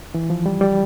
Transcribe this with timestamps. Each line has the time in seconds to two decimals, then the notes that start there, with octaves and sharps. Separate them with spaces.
0.14 E3
0.30 F3
0.46 G3
0.61 G3